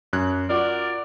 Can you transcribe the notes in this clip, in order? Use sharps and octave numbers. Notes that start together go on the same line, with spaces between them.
F#2 F#6 G#6
F4 F#4 A#4 D5